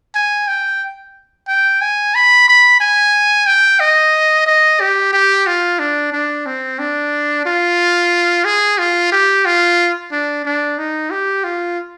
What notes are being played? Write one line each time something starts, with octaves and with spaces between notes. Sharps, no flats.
G#5
G5
G5
G#5
B5
B5
G#5
G5
D#5
D#5
G4
G4
F4
D4
D4
C4
D4
F4
G#4
F4
G4
F4
D4
D4
D#4
G4
F4